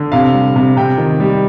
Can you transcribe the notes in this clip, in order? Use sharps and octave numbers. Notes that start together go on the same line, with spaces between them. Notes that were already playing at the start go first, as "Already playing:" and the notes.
Already playing: D3
C3 F5
G3
C3
C3 G5
D#3
G3